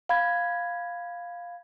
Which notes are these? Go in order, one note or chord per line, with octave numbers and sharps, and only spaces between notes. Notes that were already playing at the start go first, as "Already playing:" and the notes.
F5 B5 G#6